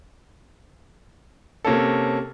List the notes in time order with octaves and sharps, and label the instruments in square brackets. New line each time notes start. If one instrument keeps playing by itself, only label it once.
[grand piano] C3 A#3 C#4 A4